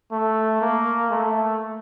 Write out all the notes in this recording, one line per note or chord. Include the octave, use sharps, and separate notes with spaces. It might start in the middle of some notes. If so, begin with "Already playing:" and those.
A3
A#3
A3